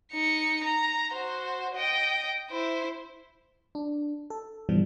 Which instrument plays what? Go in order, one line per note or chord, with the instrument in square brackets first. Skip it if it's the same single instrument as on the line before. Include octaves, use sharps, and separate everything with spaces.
[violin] D#4 C#7
A#5
F#4 C5
D#5 G5
E4 C5
[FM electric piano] D4
A4
G2 B2 E3 F3 G3